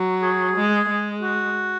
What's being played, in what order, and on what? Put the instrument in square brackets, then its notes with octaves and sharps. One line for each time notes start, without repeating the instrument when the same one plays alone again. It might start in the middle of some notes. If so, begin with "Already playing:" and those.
Already playing: [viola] F#3
[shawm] G#4
[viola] G#3
G#3
[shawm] F#4